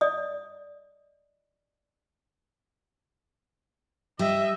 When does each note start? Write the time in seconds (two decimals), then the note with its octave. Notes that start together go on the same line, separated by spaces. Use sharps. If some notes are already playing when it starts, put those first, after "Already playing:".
0.01 D5 D#5 D#6
4.19 G3 D#5 E5